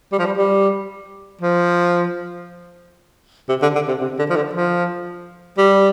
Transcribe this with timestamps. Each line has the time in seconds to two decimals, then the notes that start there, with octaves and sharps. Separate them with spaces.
0.12 G3
0.19 F3
0.26 G3
0.37 G3
1.42 F3
3.49 C3
3.62 D3
3.75 D3
3.88 C3
4.02 C3
4.19 D3
4.30 F3
4.36 D3
4.53 F3
5.58 G3